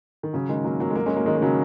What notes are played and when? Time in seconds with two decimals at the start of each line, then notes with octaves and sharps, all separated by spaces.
0.23 D#3
0.33 C#3 F#3
0.49 D#3 G#3
0.64 F#3 A#3
0.80 F#3 A#3
0.90 G#3
0.96 F#3 A#3
1.06 G#3 C#4
1.16 F#3 A#3
1.26 D#3 G#3
1.36 G#3
1.42 C#3 F#3